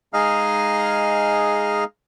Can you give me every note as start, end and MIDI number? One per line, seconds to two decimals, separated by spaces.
0.14 1.84 56
0.14 1.84 63
0.14 1.84 68
0.14 1.84 75
0.14 1.84 77
0.14 1.84 89